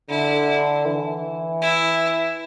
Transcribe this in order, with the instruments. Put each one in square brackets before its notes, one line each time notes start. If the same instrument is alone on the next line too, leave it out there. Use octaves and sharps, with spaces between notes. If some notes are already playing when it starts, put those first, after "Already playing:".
[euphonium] D3 [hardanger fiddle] E4
[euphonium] E3
[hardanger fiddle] E4